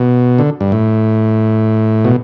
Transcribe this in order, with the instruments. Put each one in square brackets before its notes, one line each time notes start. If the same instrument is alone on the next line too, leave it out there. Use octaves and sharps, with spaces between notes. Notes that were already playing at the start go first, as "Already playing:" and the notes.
Already playing: [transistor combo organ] B2
D3
G2
A2
B2